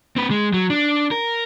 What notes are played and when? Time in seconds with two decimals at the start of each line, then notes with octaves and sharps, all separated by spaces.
0.16 C4 B4
0.31 G#3
0.54 F#3
0.70 D4
1.11 A#4